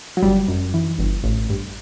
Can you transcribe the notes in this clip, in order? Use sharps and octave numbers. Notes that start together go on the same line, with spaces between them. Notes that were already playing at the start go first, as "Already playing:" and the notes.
F#3
G1 G3
F#2
E3
G1
A1
G2